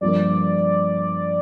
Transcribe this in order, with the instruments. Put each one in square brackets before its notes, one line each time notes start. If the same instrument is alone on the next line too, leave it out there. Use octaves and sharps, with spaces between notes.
[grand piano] G2 F3 A#3 [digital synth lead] D5